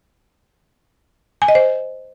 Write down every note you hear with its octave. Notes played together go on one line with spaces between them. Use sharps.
G#5
D#5
C5